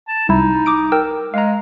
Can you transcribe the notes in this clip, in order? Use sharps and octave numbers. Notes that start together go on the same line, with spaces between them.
A5
C2 D#4 E4
D6 D#6 D7
A#4 G5 E6
G#3 F5 A#5